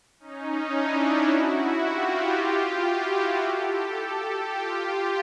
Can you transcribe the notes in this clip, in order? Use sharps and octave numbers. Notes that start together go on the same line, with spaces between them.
C#4 D#4
D4 E4
E4 F#4
F4 G4
E4 F#4
G4 A4
G4 A4
F4 G4